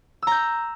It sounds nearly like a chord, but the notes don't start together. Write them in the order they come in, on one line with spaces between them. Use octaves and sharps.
E6 A#5 G6